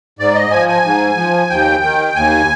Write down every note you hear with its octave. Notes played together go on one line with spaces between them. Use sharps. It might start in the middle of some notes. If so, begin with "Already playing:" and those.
G#2 D5
D#5
F3 G#5
G#5
G#2
F3
D#2 G5
D#3
D#2 G#5